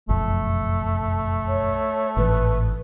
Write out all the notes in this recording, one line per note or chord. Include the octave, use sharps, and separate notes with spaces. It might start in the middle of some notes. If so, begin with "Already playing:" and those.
F#1 B1 F2 A3
C#5
G#1 A2 E3 B4